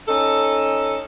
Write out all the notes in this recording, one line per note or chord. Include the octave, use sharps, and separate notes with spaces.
C#4 D#4 A4